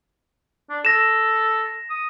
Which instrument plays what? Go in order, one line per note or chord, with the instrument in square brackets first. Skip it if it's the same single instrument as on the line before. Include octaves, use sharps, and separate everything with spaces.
[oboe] D4
[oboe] A4 [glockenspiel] A#6 E7
[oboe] D#6